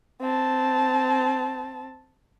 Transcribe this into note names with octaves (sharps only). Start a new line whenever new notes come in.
C4 A5